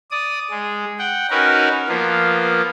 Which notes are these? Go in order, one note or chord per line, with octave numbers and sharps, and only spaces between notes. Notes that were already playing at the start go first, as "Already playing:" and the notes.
D5 D#6
G#3
F#5 G5
C#4 D#4 F#4 A#4 B4
F3 A#3 B3